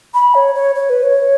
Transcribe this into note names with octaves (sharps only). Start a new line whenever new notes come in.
B5
C#5
C#5
C#5
B4
C#5